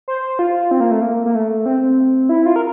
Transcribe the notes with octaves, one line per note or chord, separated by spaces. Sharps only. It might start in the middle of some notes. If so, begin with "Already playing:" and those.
C5
F4
C4
A#3
A3
A#3
A#3
A3
C4
E4
F4
A#4